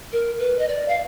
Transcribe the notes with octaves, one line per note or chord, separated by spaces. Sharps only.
A#4
B4
D#5
D5
F5